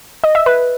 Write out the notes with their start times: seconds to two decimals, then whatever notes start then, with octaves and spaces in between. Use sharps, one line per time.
0.24 D#5
0.35 E5
0.46 B4